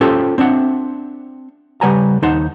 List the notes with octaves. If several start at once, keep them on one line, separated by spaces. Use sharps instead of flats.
C#4 F4 G4 A4 C5
C4 D4 E5 F#5
C#3 G3 B4 F#5 G#5 A#5
D#2 D#4 C5 F#5 A5 C6